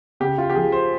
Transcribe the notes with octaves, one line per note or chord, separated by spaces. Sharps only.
C#3 G4
F4
G4
F3 G#4
C5